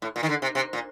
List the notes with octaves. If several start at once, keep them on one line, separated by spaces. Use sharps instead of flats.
A2
A#2
D#3
D3
C3
C3
A#2